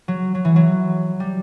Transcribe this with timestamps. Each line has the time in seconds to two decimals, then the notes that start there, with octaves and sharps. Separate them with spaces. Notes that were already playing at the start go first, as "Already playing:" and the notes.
0.08 F#3
0.35 F#3
0.45 E3
0.56 F#3
1.20 G3